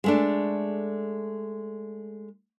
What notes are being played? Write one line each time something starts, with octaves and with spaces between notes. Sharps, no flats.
G#3 A3 D4